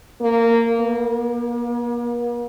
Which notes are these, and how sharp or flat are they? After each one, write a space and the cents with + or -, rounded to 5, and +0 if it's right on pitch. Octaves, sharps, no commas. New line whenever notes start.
A#3 -15
A#3 +45